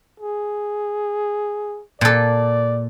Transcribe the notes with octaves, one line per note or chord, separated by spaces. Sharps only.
G#4
A#2 A4 D5